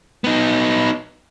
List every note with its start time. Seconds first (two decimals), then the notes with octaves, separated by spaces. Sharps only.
0.24 B3 D#4